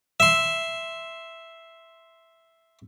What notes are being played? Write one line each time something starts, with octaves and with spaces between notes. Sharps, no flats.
E5 C6